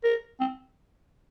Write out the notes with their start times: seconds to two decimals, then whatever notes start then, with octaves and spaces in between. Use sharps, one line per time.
0.04 A#4
0.40 C4